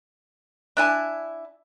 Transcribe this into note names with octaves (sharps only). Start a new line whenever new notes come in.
D4 E4 G#5 A5